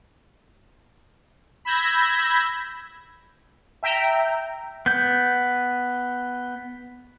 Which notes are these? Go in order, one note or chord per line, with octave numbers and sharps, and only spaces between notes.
B5 E6 G6 G#6 A#6
E5 G5 A#5
B3 G6